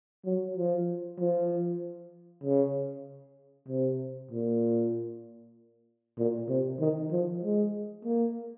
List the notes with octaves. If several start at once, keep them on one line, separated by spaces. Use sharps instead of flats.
F#3
F3
F3
C#3
C3
A#2
A#2
C3
D#3
F3
G#3
A#3